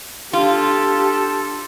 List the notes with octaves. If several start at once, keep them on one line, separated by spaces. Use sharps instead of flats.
D4 F4 G4 A4 C6